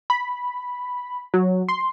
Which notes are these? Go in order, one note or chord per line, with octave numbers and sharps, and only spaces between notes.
B5
F#3
C6